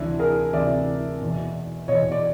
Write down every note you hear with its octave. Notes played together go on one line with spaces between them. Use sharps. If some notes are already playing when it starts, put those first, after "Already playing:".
Already playing: D2 C3 E3 D4 E4
G#4 A#4
D2 C3 E3 D5 E5
E2 B2
E2 B2 C#5 D#5
D5